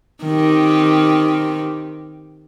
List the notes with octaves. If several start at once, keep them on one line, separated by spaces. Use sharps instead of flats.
D#3 C4 G4